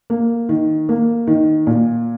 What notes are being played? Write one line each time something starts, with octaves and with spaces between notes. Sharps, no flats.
A#3
D#3
A#3
D#3
A#2